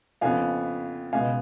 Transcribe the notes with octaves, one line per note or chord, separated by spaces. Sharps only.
F2 C#3 F3 B3 F5 G#5
C#2 B2 G#3 B3 F5 G#5